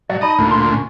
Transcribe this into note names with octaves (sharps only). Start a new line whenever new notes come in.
B1 G#2 F#3 D5
D#4 D#5 A5 B5
D2 A#2
F#2 C6
C#4